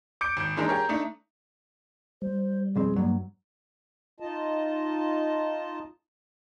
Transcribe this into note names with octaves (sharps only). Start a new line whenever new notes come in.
D6 G6 C#7 D7
G#1 G6
E3 G#3 D4 D#4 G#4 A#4
G4 G#4 A#4 C#5
A3 D4 D#4
G3 C5
B1 F2 C4 G#4
G2 F#3 A#3
D#4 F4 D#5 A5